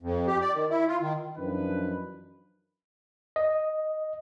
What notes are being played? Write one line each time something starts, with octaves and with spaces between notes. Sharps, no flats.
F2
G4
D5
D#3
E4
F4
D#3
F#2 E3 F3 D4 D#4 B4
D#5